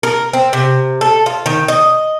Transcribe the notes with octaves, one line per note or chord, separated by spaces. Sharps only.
A#4
C4
C3
A4
F4
D#3
D#5